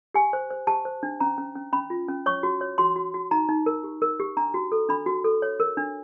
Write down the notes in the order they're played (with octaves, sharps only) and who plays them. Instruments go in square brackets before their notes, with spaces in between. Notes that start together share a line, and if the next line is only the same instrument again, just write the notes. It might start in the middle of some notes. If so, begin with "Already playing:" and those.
[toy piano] G4 G#5
C5
C5
G4 A5
C5
D4
C#4 A#5
C#4
C#4
C#4 B5
F4
C#4
C#5 C#6
F#4
C#5
F#4 C6
F#4
F#4
D#4 A#5
D#4
A#4
G4
A#4
G4
D4 A#5
F#4
A4
D4 B5
F#4
A4
C#5
A#4
D4